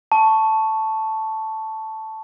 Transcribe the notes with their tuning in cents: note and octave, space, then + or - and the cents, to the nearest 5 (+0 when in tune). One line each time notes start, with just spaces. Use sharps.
A5 +0 C#6 +0